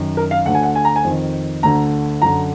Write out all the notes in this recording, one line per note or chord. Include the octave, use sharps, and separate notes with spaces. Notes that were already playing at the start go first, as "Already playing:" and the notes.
Already playing: F#2 D#3
A#4
F5
D2 D3 F#5
G#5
F#5
G#5
A#5
G#5
F2 D#3
D2 D3 A#5
F#2 D3 A#5